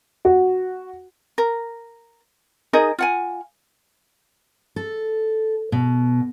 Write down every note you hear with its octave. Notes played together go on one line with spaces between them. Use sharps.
F#4
A#4
D#4 G#4 A#4 D#5
F4 F#5 G#5
A4
B2